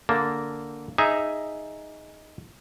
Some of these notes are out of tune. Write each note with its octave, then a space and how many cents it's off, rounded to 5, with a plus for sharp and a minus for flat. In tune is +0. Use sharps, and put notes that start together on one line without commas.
D3 -10 A#3 -10 A5 +0
D#4 +0 G#4 +0 E5 +0